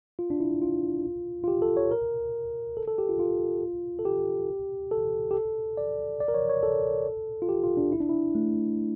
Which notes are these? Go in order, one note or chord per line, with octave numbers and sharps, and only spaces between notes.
F4
D4
E4
F4
F4
G4
A4
C#5
A#4
A4
A4
G4
F4
F4
A4
G4
A4
G4
A4
D5
D5
A#4
C#5
C#5
A4
F4
G4
F4
D4
E4
D4
E4
A3